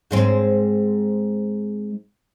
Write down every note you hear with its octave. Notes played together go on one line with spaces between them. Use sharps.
G#2 G#3 C4